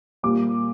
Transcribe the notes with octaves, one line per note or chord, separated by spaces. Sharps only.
A#2 G3 A#3 D6